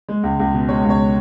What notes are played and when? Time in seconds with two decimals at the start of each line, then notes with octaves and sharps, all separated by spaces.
0.09 G#3
0.23 C#2
0.39 C#2
0.54 B2
0.69 G#3 C#5
0.84 C#2
0.90 C#5